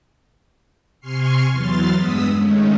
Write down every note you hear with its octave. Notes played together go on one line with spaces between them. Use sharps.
C3 G#5 C6 C#6 F6 C7
E2 E3 F#3 C6 F6 A6
G2 G#3 B3 D#6 E6 B6
D#3 G#3 A3 C#4